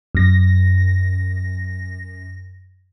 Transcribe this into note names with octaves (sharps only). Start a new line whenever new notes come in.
F#2 A#6